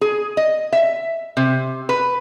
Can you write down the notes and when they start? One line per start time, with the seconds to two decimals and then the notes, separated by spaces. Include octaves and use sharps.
0.01 G#4
0.37 D#5
0.73 E5
1.37 C3
1.89 B4